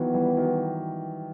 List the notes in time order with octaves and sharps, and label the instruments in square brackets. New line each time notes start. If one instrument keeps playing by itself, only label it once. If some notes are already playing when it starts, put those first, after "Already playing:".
Already playing: [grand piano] D#3 E3 F#3 [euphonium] B3
[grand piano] E3 G3
G3
D#3 F#3